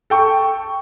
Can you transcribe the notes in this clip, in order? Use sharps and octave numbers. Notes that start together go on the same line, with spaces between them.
A4 G5 C#6